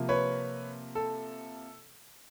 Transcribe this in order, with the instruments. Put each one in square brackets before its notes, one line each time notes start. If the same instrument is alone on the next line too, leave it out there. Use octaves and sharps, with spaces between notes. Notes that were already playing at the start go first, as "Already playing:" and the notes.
Already playing: [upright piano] C3 F3 A#3
[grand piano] B4 C#5
A4